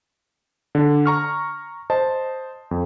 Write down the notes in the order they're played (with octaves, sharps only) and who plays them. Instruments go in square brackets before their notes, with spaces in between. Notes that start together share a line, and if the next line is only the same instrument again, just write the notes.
[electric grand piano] D3 D4
A#5 C#6 F6
C5 D#5 A5
F2